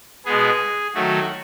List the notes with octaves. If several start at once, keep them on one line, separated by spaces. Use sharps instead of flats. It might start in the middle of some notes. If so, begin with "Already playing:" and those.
B2 G#3 B3 G#4
D#3 F#3 A3 F#4